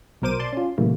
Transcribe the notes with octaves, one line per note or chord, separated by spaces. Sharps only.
B1 B2 A#4 C5 D6 D#7
D5 A5 C6
C#4 F4
A#2 C#3 E3 G3 A3 A#3